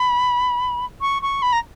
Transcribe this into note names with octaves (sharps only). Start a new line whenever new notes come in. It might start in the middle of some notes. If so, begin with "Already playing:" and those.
Already playing: B5
C#6
C#6
B5
A#5